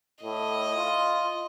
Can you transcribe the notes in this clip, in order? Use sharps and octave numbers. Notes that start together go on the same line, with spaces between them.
A2 D#5
F4